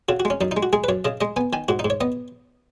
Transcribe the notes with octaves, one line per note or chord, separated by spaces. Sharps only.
C#3 F#4
F#4
G#3
C#4
F#2 D#4
D#4
G#3
F#4
G#3 G#4
B4
F#2 C#5
C#3 D#5
G#3 D#5
B3 G#5
D#3 G#5
G#2 F#4
D#4
G#2
C#5
B3 D#5